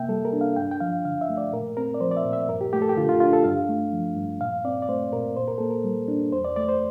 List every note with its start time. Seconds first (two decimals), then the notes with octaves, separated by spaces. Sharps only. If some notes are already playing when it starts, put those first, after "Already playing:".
Already playing: C3 A#3 E5 G5
0.09 G3 A4
0.25 A#4
0.33 D4
0.41 F5
0.56 G2 G5
0.71 G5
0.80 F3 F5
1.05 D3 F5
1.21 E5
1.29 A3
1.37 D5
1.53 A#2 A#4
1.77 C4 A#4
1.94 D5
2.00 F3 C5
2.11 D5
2.17 E5
2.25 A#2
2.33 E5
2.49 G2 A#4
2.61 G4
2.73 A3 G4
2.82 A4
2.89 G4
2.97 D3 F4
3.09 F4
3.20 D4 F4
3.33 A4
3.44 G2 F5
3.69 A3
3.93 F3
4.16 G2
4.41 A#2 F5
4.65 C4 D5
4.82 D5
4.89 A3 C5
5.13 A#2 A#4
5.36 A#2 C5
5.48 A#4
5.58 A#3 A4
5.70 A#4
5.84 G3
6.08 D4
6.32 E2 C5
6.45 D5
6.56 A3 D5
6.69 C5